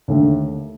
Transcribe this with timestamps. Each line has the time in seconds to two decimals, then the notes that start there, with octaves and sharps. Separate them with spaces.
0.08 D#2 D3 A3